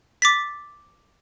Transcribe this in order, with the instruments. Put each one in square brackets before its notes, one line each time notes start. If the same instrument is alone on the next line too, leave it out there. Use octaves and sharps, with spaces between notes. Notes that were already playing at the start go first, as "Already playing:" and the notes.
[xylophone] D6 A6 B6